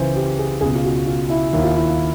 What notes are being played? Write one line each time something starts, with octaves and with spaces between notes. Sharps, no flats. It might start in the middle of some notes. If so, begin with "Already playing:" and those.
Already playing: C#2 C#3 E3 C5
G4
G#4
C#2 B2 G#4
F4
F#4
F4
E4
D#2 D#3 E4
F4
E4